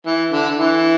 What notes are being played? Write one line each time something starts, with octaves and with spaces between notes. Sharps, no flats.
E3
D3
E3